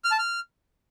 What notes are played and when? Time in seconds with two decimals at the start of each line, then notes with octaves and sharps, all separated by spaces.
0.04 F6
0.12 A5
0.19 F6